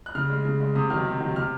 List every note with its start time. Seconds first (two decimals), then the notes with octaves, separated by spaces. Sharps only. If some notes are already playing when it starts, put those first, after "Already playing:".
0.06 F#6
0.15 C#3 F6
0.30 G#3
0.45 C#3
0.60 G#3
0.75 C3 D#6
0.90 D#3 F#3 F6
1.06 C3
1.20 D#3 F#3
1.36 C3 F6